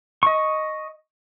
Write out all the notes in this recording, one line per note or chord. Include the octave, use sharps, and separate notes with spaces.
D#5 C#6